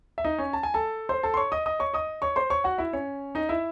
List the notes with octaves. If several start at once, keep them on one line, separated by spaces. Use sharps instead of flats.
E5
D#4 D#5
C#4 C#5
A5
G#5
A4 A5
C5 C6
A4 A5
C6
C#5 C#6
D#5 D#6
D#5 D#6
C#5 C#6
D#5 D#6
C#5 C#6
C5 C6
C#5 C#6
F#4 F#5
E4 E5
C#4 C#5
D#4 D#5
E4 E5